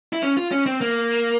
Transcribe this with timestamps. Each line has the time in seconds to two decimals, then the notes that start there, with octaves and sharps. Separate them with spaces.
0.13 E4
0.23 C#4
0.37 F4
0.52 C#4
0.66 C4
0.81 A#3